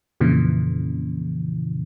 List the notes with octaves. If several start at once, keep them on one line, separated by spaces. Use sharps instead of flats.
F2 A#2 C#3 E3